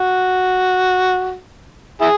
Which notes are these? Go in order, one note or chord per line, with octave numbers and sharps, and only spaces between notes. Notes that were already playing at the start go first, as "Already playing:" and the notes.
Already playing: F#4
E4 G#4